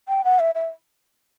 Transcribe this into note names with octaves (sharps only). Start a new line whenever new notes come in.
G5
F#5
E5
E5